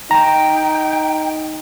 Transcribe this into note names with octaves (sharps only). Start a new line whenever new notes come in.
D#4 G5 A#5